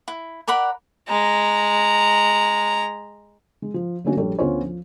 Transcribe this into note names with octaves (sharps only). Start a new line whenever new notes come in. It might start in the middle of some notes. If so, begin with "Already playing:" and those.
E4
A#4 D5 F#5 B5
G#3 A#5
G#3
F3
D3 F#3 A3 A#3 C#4 F#4
A#1 G3 A4 C#5
D2 B3 C#4 F4 C5 C#5
F3